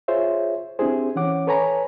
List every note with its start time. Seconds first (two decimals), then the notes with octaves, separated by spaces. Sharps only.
0.08 F4 G#4 C5 C#5 E5
0.79 C4 D4 E4 G4 G#4 C5
1.16 E3 C#4 C#5 F#5 D6
1.47 A4 B4 C#5 G#5 A#5 B5